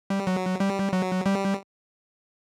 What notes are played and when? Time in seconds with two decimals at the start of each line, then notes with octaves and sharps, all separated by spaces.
0.10 G3
0.27 F#3
0.60 G3
0.93 F#3
1.26 G3